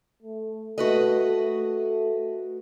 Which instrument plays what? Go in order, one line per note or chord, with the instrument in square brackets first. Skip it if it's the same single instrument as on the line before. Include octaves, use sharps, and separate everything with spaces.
[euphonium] A3
[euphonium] A3 [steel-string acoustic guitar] F#4 B4 D#5
[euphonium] A3